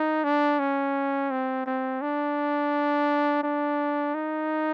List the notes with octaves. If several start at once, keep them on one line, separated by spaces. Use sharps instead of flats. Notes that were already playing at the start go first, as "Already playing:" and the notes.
Already playing: D#4
D4
C#4
C4
C4
D4
D4
D#4